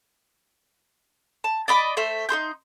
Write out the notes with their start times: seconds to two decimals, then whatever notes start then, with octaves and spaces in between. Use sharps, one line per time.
1.44 A5
1.68 D5 D#5 B5 D6
1.97 A3 C5 E5
2.29 D#4 G#4 C6 G6